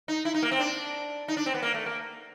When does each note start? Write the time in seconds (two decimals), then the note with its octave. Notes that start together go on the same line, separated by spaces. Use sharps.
0.08 D#4
0.25 E4
0.34 D#4
0.42 A#3
0.51 C4
0.60 D4
1.28 D#4
1.37 D4
1.46 C4
1.54 B3
1.63 A#3
1.74 A3
1.86 A#3